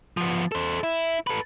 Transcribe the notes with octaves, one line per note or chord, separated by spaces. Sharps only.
F3 B3
A4 C5
E4
A4 B4